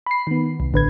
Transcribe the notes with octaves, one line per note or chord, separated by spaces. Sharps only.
B5 C7
D#3 B3
C2
A1 D3 B4 G#6